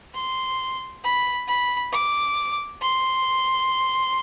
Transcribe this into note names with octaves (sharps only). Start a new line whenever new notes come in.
C6
B5
B5
D6
C6